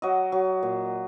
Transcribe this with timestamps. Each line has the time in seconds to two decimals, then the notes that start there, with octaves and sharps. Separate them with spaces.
0.02 F#3 D#5
0.32 F#3
0.63 A#2